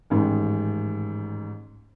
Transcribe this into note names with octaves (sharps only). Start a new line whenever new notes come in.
A1 G#2 D#3